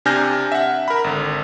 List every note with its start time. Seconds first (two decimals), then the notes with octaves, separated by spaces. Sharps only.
0.05 C3 D4 G#5 F6 G6 A#6
0.52 E5 F#5
0.88 A#4 B5
1.04 G#1 D3